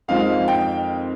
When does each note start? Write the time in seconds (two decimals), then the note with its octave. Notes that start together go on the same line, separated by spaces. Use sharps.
0.08 F2 D#3 G#3 C4 F4 F5
0.48 G5